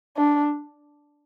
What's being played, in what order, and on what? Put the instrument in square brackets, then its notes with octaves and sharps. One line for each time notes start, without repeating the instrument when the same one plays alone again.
[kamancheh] D4